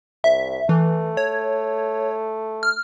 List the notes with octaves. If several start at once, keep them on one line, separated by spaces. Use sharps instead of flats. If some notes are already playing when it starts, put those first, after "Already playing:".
C2 E5
E3 A3
C#5
F6